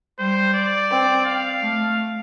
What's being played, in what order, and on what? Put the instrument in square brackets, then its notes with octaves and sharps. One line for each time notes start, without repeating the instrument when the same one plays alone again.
[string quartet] G3 [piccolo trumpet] C5
[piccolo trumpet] D5
[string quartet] C4
[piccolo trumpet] F5
[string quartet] A3